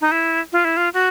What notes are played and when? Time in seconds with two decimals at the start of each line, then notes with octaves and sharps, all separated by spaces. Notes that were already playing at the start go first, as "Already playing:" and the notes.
0.01 D#4
0.12 E4
0.52 F4
0.64 E4
0.77 F4
0.94 F#4